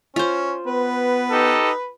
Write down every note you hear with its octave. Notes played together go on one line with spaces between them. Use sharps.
C#4 F4 C5
B3 B4
D#4 G4 A4